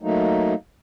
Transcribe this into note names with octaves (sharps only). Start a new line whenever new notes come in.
F#3 A3 A#3 D#4